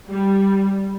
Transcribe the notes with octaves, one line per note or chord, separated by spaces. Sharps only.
G3